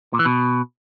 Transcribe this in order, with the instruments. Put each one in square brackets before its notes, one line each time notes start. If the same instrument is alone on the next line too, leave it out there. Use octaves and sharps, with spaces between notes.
[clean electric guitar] A#2
E3
B2